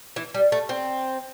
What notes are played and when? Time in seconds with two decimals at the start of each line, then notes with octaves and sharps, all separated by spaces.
0.16 E3
0.34 G3
0.52 A3
0.69 C4